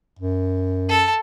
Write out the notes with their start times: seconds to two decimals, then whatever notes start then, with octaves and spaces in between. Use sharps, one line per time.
0.19 F#2
0.89 A4 A5